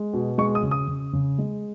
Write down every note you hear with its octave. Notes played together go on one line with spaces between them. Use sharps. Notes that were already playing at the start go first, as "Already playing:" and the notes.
Already playing: G#3
B2
G#3 C#6
D#6
C#3
D#6
C#3
C#3
G#3